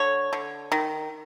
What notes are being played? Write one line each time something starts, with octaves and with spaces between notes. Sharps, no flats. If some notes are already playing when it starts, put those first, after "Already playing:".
Already playing: D3 C#5
D3
D#3